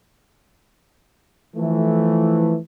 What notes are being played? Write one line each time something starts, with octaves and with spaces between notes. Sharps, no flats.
E3 F3 A3